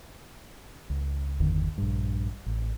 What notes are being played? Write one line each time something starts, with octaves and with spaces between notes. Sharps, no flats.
C#2
G1 E2 D3 D#3
A#1 G2
A1